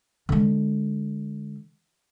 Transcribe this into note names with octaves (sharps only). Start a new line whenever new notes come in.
D3 G#3